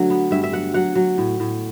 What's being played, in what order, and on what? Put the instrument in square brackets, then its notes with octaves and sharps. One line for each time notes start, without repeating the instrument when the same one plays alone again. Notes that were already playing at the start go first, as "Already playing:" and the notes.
Already playing: [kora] D3 F#3 A3
B3
G2 E5
E5
F#3 F#5
F#3 F#5
F#3
A2
A2